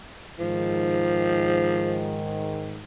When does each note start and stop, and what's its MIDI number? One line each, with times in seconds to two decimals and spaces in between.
0.39 2.82 44
0.39 2.82 51
0.39 2.24 53